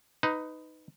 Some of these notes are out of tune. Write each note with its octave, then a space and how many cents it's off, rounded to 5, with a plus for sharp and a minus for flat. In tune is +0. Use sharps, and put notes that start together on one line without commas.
D#4 +0 B4 +20